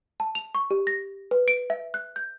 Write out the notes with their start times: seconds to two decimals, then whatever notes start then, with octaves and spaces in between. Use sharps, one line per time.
0.20 A5
0.35 F7
0.55 C#6
0.71 G4
0.87 A#6
1.31 B4
1.48 D7
1.70 E5
1.94 F#6
2.16 G6